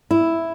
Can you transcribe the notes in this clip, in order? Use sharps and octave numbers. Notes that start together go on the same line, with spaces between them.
E4